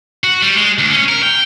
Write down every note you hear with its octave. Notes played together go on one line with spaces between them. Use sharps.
F#4
G3
G#3
D2
C#4
A#4
G5